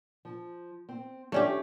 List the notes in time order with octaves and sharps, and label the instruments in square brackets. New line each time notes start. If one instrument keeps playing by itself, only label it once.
[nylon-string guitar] F3
C4
[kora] A3 C#4 G4 [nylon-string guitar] D4 F4 D5